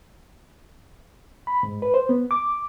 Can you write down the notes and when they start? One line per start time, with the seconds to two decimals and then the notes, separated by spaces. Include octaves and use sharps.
1.47 B5
1.63 G#2
1.82 B4
1.94 C5
2.09 B3
2.31 D6